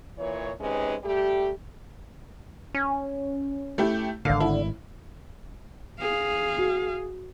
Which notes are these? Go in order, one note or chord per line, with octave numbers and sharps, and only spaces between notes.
A#2 E3 C#5
C3 G#3 C#4 D#4 B4
G3 A3 G4
C#4
A3 E4 G4
G#1 A2 D3 F5
E4
G#4 F5
F#4